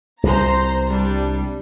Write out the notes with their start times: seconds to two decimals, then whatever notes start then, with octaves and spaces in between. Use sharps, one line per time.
0.23 C2 C5 A#5
0.90 G3 D4